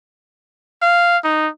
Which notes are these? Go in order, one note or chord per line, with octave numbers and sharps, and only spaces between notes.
F5
D#4